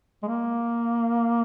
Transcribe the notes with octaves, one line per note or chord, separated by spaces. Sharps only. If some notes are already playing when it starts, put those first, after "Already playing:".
G#3
A#3